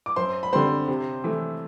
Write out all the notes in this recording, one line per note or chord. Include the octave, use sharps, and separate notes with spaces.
D6
F#2 C5 C6
B5
D3 G3 C4 C5 C6
C3
E3 A3